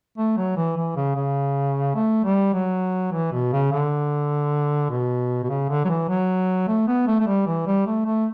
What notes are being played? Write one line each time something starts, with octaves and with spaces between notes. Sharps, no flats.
A3
F#3
E3
E3
C#3
C#3
A3
G3
F#3
E3
B2
C#3
D3
B2
B2
C#3
D3
F#3
E3
F#3
A3
B3
A3
A3
G3
E3
G3
A3
A3